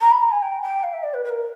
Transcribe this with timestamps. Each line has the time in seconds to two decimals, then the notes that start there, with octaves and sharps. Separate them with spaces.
0.01 A#5
0.11 B5
0.21 A#5
0.31 G#5
0.42 G5
0.62 G5
0.83 F5
0.93 E5
1.03 D5
1.14 B4
1.24 B4
1.29 A#4